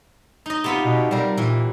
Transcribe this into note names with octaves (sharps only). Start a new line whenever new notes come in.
D#4 D#5
C3 B3 F4
B2
G3 C4 A#4
A#2 E3